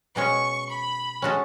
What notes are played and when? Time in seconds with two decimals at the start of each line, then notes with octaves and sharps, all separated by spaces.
0.15 B2 G#3 C#4 C#6
0.70 B5
1.22 G#3 C#4 F#4 A4